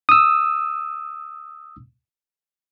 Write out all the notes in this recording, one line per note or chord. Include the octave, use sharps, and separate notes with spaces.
D#6 E6